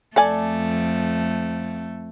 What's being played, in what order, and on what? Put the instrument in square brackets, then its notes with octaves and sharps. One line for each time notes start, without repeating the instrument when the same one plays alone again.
[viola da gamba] F2 A3 [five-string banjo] A4 D5 G#5